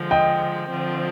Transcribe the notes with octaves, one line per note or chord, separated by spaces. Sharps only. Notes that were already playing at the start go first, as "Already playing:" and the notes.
Already playing: D3 F3 G#3
D#5 G5
D3 F3 C4